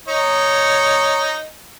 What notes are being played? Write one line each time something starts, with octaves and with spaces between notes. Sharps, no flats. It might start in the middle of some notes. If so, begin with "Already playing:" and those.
D#4 C#5